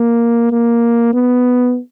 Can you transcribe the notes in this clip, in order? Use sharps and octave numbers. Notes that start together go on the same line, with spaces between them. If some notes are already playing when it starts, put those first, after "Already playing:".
Already playing: A#3
A#3
B3